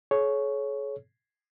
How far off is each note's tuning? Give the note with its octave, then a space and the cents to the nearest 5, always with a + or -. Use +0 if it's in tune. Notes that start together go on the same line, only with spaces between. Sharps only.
G#4 +45 C#5 +0